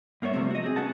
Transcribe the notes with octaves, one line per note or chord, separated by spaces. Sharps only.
G2 A#3 B3 C#5 E5
C3 E3 F3 G3 A3 C4
F#4 D#5
C4 G#4
C#4 F#4 B4 F#5 A5